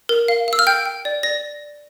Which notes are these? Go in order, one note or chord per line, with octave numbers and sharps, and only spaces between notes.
A#4
F5
F5 E6
F6
G5 G6
G5
D5
D5 A#6